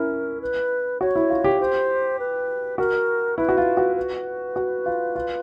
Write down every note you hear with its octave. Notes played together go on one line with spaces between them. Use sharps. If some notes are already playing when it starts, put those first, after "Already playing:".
Already playing: C#4 E4 A#4
B4
F#4 C#5
E4
F4
G4
C5
B4
F#4 A#4
E4 B4
F#4
F4
F#4
B4
F#4
F4
F4